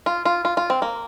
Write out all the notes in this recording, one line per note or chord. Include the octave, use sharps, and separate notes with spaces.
F4
F4
F4
F4
C4
A#3